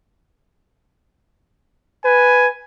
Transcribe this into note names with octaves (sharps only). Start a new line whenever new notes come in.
B4 G#5